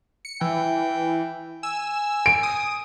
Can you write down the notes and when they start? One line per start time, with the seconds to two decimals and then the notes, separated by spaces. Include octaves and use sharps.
0.25 C#7
0.41 E3 G5
1.63 G#5 E6
2.26 D7
2.43 D#6